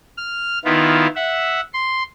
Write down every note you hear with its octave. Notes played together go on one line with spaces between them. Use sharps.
F6
D#3 B3 E4 F4
E5 F#5
C6